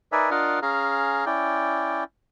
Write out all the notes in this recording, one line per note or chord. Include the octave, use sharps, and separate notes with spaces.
D#4 A#4 B4 D5 E5 G#5
D4 F4 A#4 D#5 F5 F#5
C#4 G#4 F5 A#5
C#4 E4 D5 G5